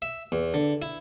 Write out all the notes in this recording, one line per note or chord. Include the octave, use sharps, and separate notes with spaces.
E5
E2
D3
E4